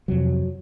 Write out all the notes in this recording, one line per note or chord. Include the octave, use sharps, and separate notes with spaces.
F2 C3 F#3